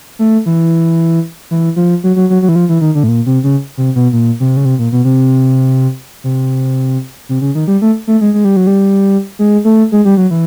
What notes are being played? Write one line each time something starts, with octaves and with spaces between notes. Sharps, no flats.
A3
E3
E3
F3
F#3
F#3
F#3
F#3
E3
F3
E3
D#3
D3
A2
A#2
C3
C#3
C3
B2
A#2
C3
C#3
C3
A#2
B2
C3
C3
C3
C#3
D#3
G3
A3
A3
G#3
G#3
G3
F#3
G3
G#3
A3
G#3
G3
F#3
E3